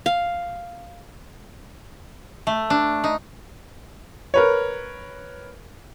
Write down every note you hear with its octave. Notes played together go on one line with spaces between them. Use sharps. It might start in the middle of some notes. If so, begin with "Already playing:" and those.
F5
A3
D4
D#4
A#4 B4 C#5